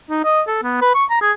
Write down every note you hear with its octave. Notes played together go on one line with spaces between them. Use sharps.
D#4
D#5
A4
B3
B4
C#6
A#5
G#4